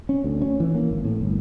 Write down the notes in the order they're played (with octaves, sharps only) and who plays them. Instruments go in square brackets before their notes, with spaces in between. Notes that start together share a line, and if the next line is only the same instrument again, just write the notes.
[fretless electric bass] C#4
D2
C#4
E3
A#3
G#1
A2
G1